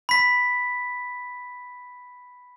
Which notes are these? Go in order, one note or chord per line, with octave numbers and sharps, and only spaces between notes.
B5 B6